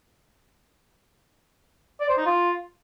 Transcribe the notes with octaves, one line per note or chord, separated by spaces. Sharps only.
D5
C5
D#4
F4